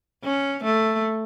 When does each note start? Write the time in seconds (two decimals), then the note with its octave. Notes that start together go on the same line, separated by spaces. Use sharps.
0.24 C#4
0.64 A3